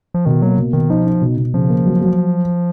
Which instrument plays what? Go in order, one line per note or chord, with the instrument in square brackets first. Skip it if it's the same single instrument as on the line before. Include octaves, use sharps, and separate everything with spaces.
[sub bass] F3
[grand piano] B2 [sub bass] D#3
[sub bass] F#3 [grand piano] A#3
[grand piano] B2
[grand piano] B2 [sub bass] D#3
[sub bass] F3 [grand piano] D#4
[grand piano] D#4
B2
B2
[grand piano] C#3 [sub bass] F3
[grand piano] A#3
F#3
F#3